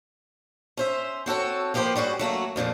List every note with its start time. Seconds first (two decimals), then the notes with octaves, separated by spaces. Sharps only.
0.77 C#4 C5 E5
1.26 C4 F#4 A4 C#5
1.74 F3 A#3 G4 B4 C5
1.96 G3 C#4 F#4 G#4
2.19 F#3 A3 A#3 F#4
2.56 F2 A#2 D3 F3